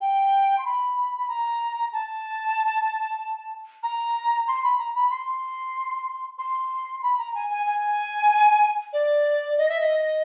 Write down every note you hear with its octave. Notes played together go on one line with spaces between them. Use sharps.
G5
C6
B5
B5
A#5
A5
A#5
C6
B5
A#5
B5
C6
C6
B5
A#5
G#5
G#5
G#5
D5
D#5
E5
D#5